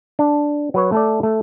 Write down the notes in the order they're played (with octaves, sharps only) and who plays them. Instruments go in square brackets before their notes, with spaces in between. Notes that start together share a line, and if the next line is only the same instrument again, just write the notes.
[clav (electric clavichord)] D4
F#3 B4 C#5
A3 A4 D5
A3